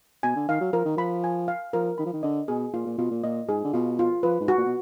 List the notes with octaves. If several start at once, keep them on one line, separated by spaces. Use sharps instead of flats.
B2 G#5
D3
D#3 F5
F#3
F3 A#4
D#3
F3 B5
G#5
F5
F3 A#4
D#3 B5
F3
D#3
D3 D#5
B2 G#4
A#2 F4
A#2
B2 F4
A#2
A#2 D#5
G#2 G#4
D3
B2 F4
F4
F3 B4
G#2
F#4
A#2
B2